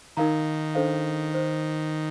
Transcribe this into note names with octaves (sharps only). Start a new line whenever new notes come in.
D#3 D#4 A#4 F5 A#5
D4 A4 C5 F5
C5